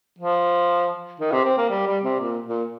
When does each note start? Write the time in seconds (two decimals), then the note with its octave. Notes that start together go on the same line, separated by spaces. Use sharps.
0.19 F3
1.20 D#3
1.32 C3
1.45 C4
1.58 A#3
1.70 G3
1.87 G3
2.04 C3
2.20 A#2
2.46 A#2